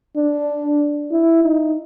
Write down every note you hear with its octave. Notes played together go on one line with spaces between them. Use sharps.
D4
E4
D#4